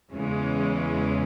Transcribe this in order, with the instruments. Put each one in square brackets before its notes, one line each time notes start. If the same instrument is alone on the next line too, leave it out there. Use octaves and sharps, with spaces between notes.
[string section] E2 C#3 E3 G#3 C#4